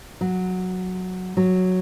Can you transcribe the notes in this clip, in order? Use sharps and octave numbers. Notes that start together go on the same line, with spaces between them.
F#3
F#3